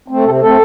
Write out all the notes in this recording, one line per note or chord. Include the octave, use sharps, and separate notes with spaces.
A3 C4
C3 A4
A3 C4 A4